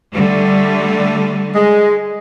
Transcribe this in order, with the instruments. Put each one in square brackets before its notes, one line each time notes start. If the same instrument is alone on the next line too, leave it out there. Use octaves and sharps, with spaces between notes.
[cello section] D3 G3 A3
[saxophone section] G#3